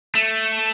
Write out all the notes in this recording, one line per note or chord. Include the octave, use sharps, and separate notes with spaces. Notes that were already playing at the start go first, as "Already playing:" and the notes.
A3